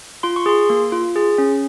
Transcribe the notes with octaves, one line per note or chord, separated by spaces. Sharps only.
F4 C6
C#6
G#4 C6
A#3
F4
G#4
C#4